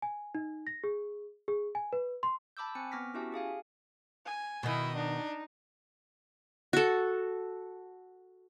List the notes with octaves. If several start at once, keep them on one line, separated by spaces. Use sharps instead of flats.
G#5
D#4
A#6
G#4
G#4
G#5
B4
C6
A5 B5 D6 E6 G6
C4 G#5 C#7
B3 D6 F6 A#6 B6
C#4 E4 F#4 G4 E5 A5
G4 G#4 F5 G#5
G#5
B2 D#3 E4 D#5
D4 D#4
F#4 A4